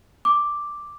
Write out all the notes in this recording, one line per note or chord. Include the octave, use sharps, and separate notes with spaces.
D6